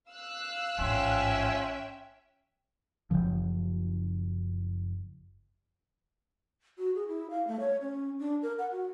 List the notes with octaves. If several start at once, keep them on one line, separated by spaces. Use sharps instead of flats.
F5 E6 F#6
A1 G#2 F3 C#4 E5 G5 G#5 C6
F#1 C2 C#3 F3
F#4
G#4
E4
F5
A3
C#5
C#4
D4
A#4
F#5
F#4